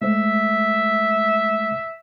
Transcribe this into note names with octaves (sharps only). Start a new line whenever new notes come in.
G#3 A3 C5 E5